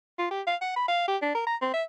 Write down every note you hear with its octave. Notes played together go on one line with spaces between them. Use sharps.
F4
G4
F5
F#5
B5
F5
G4
D4
A#4
A#5
C4
E5